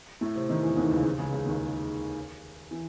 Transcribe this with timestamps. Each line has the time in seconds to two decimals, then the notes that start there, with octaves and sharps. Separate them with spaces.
0.21 A2 A3
0.35 C3 C4
0.49 D#3 D#4
0.62 E2 E3
0.77 D#2 D#3
0.90 C#2 C#3
1.04 C3
1.18 C#2 C#3
1.32 C#2 C#3
1.46 D#2 D#3
2.71 E3